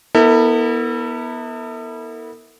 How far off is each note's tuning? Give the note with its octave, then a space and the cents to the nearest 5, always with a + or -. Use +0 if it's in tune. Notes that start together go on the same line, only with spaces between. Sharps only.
B3 -20 E4 -25 A4 +40